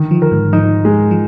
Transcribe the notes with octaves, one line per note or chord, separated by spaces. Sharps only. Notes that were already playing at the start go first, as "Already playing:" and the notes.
Already playing: D3 D#3
F3
A#4
G#2
F3 D#4
G#3
F3